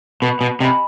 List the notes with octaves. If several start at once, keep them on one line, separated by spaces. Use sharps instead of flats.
B2 B4
B2
C3 D#5 G#5 B5